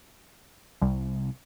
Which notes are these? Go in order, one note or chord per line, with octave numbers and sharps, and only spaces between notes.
C2